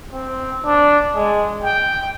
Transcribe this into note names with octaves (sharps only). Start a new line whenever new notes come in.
C4
D4
G#3
G5